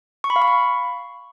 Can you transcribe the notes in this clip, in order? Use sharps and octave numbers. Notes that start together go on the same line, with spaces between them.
C#6
B5
F5
C#6
B5